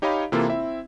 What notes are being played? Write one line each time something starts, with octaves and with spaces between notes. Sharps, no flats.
D#4 G4 C#5 D#5 F5 B5
C3 E3 A#3 E4 F4 A4
C4 E4 E5